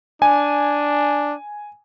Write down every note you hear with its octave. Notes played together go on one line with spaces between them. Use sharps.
D4 G#5